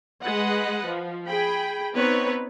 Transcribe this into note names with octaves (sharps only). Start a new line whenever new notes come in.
G#3 B4 D#5 F#5
F3
G#4 G5 B5
B3 C4 D#4 B4 C#5